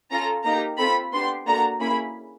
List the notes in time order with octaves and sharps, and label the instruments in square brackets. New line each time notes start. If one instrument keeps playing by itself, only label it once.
[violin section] C#4 F4 A4 A#5
A#3 D#4 G4 A#5
C4 F4 A4 B5
B3 D4 G4 C6
A#3 D4 F#4 A4 A#5
A#3 C#4 E4 G#4 B5